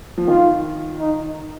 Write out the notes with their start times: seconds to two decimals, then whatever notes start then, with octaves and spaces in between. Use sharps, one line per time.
0.18 F3
0.27 D#3 F4
1.00 D#4